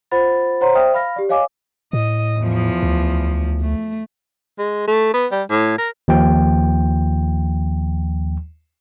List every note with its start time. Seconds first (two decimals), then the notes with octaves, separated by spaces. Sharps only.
0.11 F4 C5 F#5 B5 A6
0.61 C5 C#5 F#5 A#5 C6
0.74 C5 D5 E5 G5 D#6 F6
0.94 F5 B5 F6 A#6
1.16 G4 D5
1.29 C#5 D#5 F5 G#5 D6
1.93 A2 D#5
2.39 E2 F3
2.83 D2
3.61 A3
4.58 G#3
4.87 A3
5.14 B3
5.32 G3
5.50 A2
5.78 A#4
6.08 D#2 F3 G5